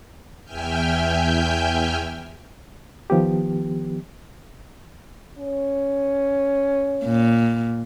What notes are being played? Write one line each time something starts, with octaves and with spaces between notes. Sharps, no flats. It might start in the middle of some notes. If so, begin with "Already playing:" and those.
E2 E5 G5 G#5 F6 G6
D#3 F3 B3 G4
C#4
A#2